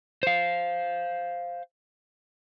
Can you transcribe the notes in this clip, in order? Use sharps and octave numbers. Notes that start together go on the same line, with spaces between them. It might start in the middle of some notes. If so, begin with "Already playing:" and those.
C5 F5